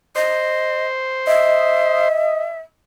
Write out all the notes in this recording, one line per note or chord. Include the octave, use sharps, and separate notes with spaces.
C5 D#5
D#5 E5